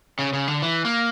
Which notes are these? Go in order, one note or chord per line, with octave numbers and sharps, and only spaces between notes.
C#3
C#3
D3
E3
A#3